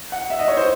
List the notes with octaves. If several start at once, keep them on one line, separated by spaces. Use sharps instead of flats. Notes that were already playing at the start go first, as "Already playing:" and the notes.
F#5
E5
D#5
C#5
C5